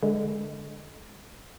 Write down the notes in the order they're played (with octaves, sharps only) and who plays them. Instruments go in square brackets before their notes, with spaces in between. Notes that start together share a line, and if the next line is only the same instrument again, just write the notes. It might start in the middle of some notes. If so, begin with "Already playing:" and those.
[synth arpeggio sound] D3 G#3